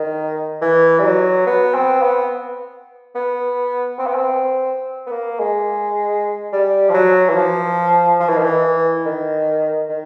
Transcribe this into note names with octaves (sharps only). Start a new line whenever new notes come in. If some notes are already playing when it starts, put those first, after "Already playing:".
Already playing: D#3
E3
G3
F#3
B3
C4
B3
B3
C4
B3
C4
B3
A#3
G#3
G3
F3
F#3
E3
F3
F3
E3
D#3
E3
D#3
D#3